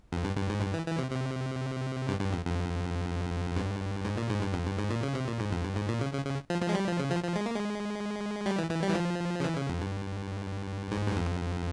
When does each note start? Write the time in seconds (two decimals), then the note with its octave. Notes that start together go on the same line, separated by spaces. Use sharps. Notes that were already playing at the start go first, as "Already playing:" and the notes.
0.12 F2
0.25 G2
0.37 G2
0.49 G#2
0.61 G2
0.74 E3
0.86 E3
0.98 C3
1.11 C3
2.08 G2
2.20 G2
2.33 F2
2.45 F2
3.56 G2
4.05 G#2
4.17 A#2
4.30 G#2
4.42 G2
4.54 F2
4.66 G2
4.79 G#2
4.90 A#2
5.03 C#3
5.15 C3
5.28 A#2
5.40 G#2
5.52 F2
5.64 G2
5.76 G#2
5.89 A#2
6.01 C#3
6.13 C#3
6.25 C#3
6.50 F3
6.62 F3
6.69 G#3
6.75 G3
6.87 F3
6.99 C#3
7.11 F3
7.23 F3
7.36 G#3
7.46 A#3
7.55 G#3
8.46 G3
8.58 E3
8.70 E3
8.83 G3
8.90 E3
8.95 F3
9.40 C#3
9.44 E3
9.56 C#3
9.69 F2
9.81 G2
10.92 G#2
11.07 G2
11.16 F2